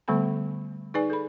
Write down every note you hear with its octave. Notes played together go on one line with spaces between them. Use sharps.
D3 G3 A3 B3 A4 B5
D#4 G#4 B4 D5 G#5
A4 B5